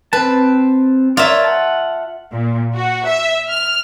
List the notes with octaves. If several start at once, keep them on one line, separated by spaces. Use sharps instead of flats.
C4 B4 A5
F4 A#4 C#5 D5 E5
F#5 A5
A#2
F#4
E5
F6